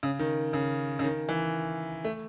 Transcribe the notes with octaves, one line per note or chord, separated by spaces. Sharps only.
C#3
D#3
C#3
C#3
D#3
E3
A3